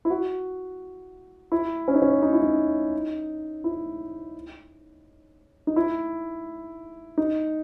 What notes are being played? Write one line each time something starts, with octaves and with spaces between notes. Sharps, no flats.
E4
F#4
E4
C#4
D#4
C#4
D#4
E4
D#4
E4
D#4
E4
D#4